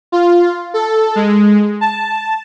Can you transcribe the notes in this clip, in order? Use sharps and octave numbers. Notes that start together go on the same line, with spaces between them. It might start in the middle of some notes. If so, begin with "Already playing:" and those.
F4
A4
G#3
A5